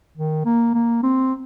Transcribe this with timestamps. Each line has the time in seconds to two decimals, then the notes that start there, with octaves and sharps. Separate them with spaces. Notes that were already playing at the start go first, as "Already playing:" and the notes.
0.17 D#3
0.45 A#3
0.74 A#3
1.03 C4